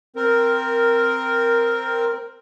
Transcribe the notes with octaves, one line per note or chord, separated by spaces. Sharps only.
C4 A#4